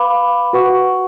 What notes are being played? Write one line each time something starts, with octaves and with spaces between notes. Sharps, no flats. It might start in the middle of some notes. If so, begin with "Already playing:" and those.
Already playing: B4 F5 B5 D6
F#4 B4 F#5 C#6